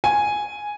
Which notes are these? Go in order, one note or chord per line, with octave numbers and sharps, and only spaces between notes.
G#5